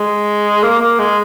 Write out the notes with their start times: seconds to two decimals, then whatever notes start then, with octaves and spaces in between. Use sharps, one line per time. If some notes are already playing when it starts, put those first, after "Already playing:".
Already playing: G#3
0.63 A#3
0.81 A#3
0.99 G#3